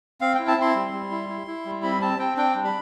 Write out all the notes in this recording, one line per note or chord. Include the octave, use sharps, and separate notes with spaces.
C4 F5
E4 G5
A5
C4 C6
G3
G3
E4
E4
E4
G3
C4 B5
C4 A5
C4 G5
D4 G5
G3
B5